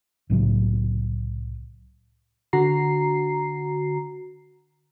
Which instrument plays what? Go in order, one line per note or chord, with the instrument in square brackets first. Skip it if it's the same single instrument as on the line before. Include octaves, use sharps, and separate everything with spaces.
[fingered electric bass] C2 A2 C#3 F#3
[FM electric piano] D3 F#4 A#5 C7